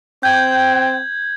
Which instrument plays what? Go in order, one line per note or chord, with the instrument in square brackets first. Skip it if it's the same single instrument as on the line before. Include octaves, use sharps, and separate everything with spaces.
[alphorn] C4 [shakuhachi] G5 [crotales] G6 G#6 F#7